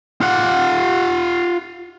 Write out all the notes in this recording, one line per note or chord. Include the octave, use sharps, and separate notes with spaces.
F4 F#5